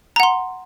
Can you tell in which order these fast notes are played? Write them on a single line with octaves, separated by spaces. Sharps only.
A#5 F#5 C6